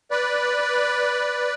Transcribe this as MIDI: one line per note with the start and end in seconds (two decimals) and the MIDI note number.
0.11 1.54 71
0.11 1.54 74